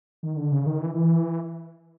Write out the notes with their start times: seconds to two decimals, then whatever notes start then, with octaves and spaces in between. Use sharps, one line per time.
0.23 D#3
0.37 D3
0.52 C#3
0.66 D#3
0.81 E3
0.94 E3